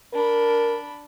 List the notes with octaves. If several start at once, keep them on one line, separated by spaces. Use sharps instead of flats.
D4 A#4 B5